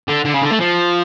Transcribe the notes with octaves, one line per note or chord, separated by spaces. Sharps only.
D3
D3
C#3
D3
A3
F3